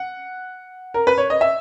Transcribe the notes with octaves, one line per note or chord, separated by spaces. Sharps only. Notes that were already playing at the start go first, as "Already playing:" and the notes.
Already playing: F#5
A#4
B4
C#5
D#5
E5